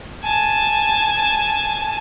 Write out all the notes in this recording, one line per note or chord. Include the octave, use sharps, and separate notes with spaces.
G#5 A5